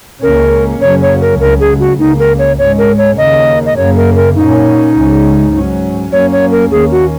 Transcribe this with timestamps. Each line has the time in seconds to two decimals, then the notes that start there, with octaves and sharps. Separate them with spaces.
0.23 C#2 C#3 A#3 C#4 A#4
0.81 F#2 C#3 F#3 A#3 C#4 C#5
1.02 C#5
1.21 A#4
1.40 C#2 C#3 F#3 A#4
1.60 G#4
1.80 F#4
1.99 C#2 C#3 A#3 D#4
2.19 A#4
2.39 C#5
2.58 G#2 G#3 C#4 C#5
2.78 A#4
2.98 C#5
3.17 D#2 C#3 A#3 D#5
3.66 D#5
3.77 F#2 C#3 A#3 C#5
3.96 A#4
4.16 A#4
4.36 A#2 A#3 C#4 D#4
4.95 C#2 C#3 G#3 C#4
5.53 G#2 F#3 C#4
6.12 F#2 F#3 A#3 C#4 C#5
6.32 C#5
6.51 A#4
6.71 D#2 D#3 A#3 C#4 G#4
6.92 F#4